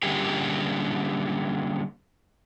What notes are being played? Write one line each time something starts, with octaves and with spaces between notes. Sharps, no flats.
D3 G3 A#3 C#4 G4 G#4